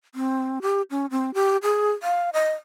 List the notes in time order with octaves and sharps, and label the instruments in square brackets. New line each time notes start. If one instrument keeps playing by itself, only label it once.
[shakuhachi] C4
G4
C#4
C4
G4
G#4
F5
D#5